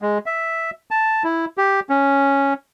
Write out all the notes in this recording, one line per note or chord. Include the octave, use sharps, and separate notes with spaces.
G#3
E5
A5
E4
G4
C#4